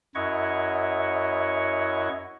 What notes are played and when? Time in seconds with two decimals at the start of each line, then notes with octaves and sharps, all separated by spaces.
0.15 F#2 E4 C#5 D#5 F#5 C#6